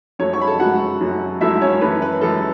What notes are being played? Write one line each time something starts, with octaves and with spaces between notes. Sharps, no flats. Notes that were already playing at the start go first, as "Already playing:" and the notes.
F#2 F#3 A3 C#5 C#6
C#5 C#6
B5
A4 A5
F#2 F#3 A3 F#4 F#5
F#2 F#3 A3
F#2 F#3 A3 E4 E5
C#4 C#5
F#2 E3 A3 B4
B4
F#2 E3 A3 A4